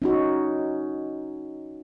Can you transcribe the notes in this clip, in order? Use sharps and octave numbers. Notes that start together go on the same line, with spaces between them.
C#4 D#4 F#4